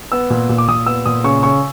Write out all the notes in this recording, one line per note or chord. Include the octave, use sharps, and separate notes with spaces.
B3 E6
A#2
A#2
D6
A#2 D#6
B3 E6
A#2 D#6
C#3 C#6
C#3 C#6